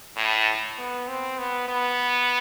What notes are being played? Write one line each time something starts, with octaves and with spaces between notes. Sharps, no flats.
A2
B3
C4
B3
B3